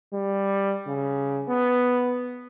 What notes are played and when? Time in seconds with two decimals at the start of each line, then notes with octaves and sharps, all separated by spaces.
0.13 G3
0.87 C#3
1.48 B3